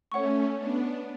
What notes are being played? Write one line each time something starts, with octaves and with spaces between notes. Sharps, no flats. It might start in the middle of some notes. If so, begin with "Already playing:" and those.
A3 C#4 C#5 F#5 C#6
B3 D4